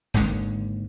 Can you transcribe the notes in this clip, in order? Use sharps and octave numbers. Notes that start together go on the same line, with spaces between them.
G#1 D#2 D3 G#3